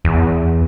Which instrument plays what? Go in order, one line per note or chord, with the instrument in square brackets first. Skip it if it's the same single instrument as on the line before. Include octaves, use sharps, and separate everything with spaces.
[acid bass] E2